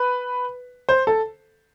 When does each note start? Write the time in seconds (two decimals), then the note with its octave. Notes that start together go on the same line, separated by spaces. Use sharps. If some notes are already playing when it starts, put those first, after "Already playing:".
Already playing: B4
0.89 C5
1.07 A4